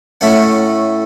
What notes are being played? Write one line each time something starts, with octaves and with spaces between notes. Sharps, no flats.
A2 A3 C#4 F#5